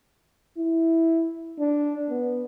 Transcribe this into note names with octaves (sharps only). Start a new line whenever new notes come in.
E4
D4
B3